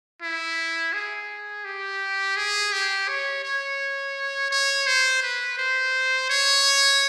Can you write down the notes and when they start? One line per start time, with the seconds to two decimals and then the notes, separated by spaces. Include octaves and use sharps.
0.22 E4
0.93 G#4
1.65 G4
2.37 G#4
2.72 G4
3.08 C#5
3.44 C#5
4.51 C#5
4.87 C5
5.23 B4
5.58 C5
6.30 C#5